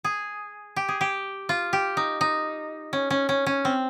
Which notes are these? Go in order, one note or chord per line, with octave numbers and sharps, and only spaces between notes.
G#4
G4
G#4
G4
F4
G4
D#4
D#4
C#4
C#4
C#4
C#4
C4